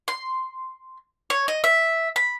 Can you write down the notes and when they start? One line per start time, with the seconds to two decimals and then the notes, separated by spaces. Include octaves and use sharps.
0.08 C6
1.30 C#5
1.48 D#5
1.64 E5
2.16 B5